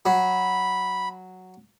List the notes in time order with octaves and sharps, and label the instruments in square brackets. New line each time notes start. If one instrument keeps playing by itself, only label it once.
[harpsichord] F#3 [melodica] B5